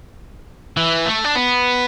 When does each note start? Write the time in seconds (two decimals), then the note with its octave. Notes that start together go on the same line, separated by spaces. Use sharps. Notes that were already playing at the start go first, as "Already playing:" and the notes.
0.77 E3
1.06 A3
1.25 D4
1.36 B3